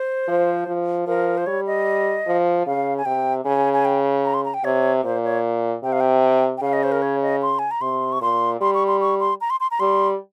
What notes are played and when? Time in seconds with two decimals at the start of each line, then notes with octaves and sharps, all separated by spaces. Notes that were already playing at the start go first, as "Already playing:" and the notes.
Already playing: C5
0.28 F3
0.67 F3
1.07 F3 A#4
1.37 C5
1.46 G3 C#5
1.67 D#5
2.26 F3
2.66 C#3 F5
2.98 G#5
3.05 C3 G5
3.45 C#3 G#5
3.73 G#5
3.85 G5
4.25 A#5
4.34 C6
4.45 A#5
4.54 G5
4.64 C3 C#5
5.04 A#2 C5
5.24 C#5
5.83 C3 G5
5.92 F5
6.00 G5
6.58 G5
6.63 C#3 F5
6.73 D#5
6.83 C5
6.92 A#4
7.02 C#5
7.22 D#5
7.42 C6
7.59 G#5
7.71 A#5
7.81 C3 C6
8.12 C#6
8.21 A#2 C6
8.61 G3 C6
8.74 C#6
8.88 C6
9.01 C#6
9.20 C6
9.41 A#5
9.50 C6
9.60 C6
9.71 A#5
9.80 G3 C6